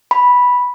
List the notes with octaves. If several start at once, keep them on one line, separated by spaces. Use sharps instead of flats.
B5